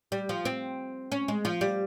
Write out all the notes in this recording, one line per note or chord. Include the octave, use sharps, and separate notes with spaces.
G3
F3
C4
C#4
G#3
F3
G3